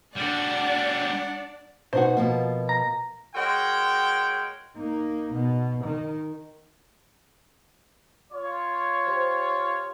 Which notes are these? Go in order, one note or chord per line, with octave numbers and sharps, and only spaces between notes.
G3 D4 F#4 D5 F#5
B2 D#4 F#4 C5 F#5
B2 F3 A#3
A#5
G#3 F#4 A#4 C#5 G5
A#3 D#4
B2
D#3
F4 C#5
G4 C5